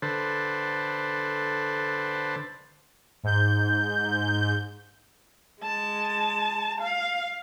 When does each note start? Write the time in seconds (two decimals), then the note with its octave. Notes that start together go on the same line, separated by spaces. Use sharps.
0.02 D3 A4 B4 C5
3.23 G#2 G6
5.62 G#3 A5
6.81 F5